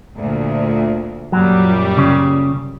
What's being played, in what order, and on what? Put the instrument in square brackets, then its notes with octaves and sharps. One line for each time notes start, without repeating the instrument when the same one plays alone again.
[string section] D2 A#2
[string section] F#2 A#2 G3 [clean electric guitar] F#3
[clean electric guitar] C#3